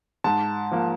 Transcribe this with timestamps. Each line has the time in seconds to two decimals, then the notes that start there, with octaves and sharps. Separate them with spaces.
0.24 G#2 A5
0.71 F3 A#3